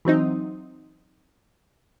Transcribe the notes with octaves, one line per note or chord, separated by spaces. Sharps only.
E3 F#3 C4 D#4